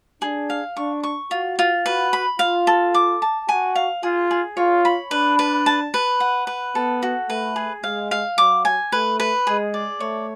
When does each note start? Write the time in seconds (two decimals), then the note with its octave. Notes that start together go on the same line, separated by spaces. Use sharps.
0.22 D4 G#4
0.50 F5
0.77 D4 C#6
1.03 C#6
1.31 F4 F#4
1.59 F4
1.85 F#4 B4
2.13 B5
2.39 F4 F5
2.67 A4
2.94 D6
3.22 A5
3.48 F#4 G#5
3.75 F5
4.02 F4 G#4
4.31 G#4
4.57 F4 C#5
4.85 B5
5.11 D4 B4
5.39 B4
5.66 A5
5.94 B4
6.20 F#5
6.47 B4
6.75 B3 A4
7.03 F#4
7.30 A3 B4
7.56 G#4
7.83 G#3 F5
8.11 F5
8.37 F#3 D6
8.65 G#5
8.92 A3 B4
9.20 B4
9.47 G#3 G#4
9.74 D5
10.00 A3 C#5